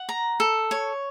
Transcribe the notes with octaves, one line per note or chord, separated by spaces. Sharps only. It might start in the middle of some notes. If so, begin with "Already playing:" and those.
Already playing: F#5
A#5
A4
C#5